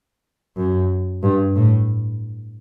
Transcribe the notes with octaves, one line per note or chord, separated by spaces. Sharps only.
F#2
G2
A2